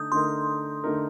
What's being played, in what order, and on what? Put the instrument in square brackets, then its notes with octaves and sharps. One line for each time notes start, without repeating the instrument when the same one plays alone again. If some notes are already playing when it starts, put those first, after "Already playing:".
Already playing: [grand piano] D3 A3 D#4 [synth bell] D#6 G6
[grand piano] D3 A3 D#4 A#4 [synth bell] C6
[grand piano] D3 A3 D#4 A#4